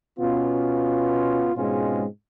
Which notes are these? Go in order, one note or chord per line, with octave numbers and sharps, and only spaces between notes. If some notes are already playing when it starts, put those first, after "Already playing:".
B2 B3 C#4 F4
G#2 B2 G#3 C4 C#4 F4